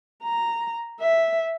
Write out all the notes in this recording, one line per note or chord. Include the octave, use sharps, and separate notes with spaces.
A#5
E5